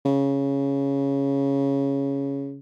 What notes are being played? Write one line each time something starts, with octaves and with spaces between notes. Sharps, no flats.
C#3